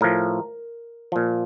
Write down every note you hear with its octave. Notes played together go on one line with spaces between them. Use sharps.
A2 F3 A#4
A#2 F3